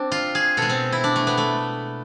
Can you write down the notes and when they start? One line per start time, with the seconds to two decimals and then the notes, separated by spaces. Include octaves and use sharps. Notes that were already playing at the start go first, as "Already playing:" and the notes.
Already playing: C4 D4
0.12 F4
0.35 G#4
0.57 B2 G#3 A4
0.70 C4
0.92 E4
1.04 D4
1.16 A3
1.27 B3
1.38 A3